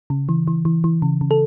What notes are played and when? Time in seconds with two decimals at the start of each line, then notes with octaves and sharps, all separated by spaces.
0.10 C#3
0.29 E3
0.48 E3
0.65 E3
0.84 E3
1.02 C#3
1.21 C#3
1.31 A4